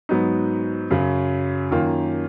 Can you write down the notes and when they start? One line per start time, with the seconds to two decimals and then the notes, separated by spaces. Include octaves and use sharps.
0.09 G#2 F#3 B3 D#4
0.90 F#2 C#3 F#3
1.71 F#2 D#3 A#3 F4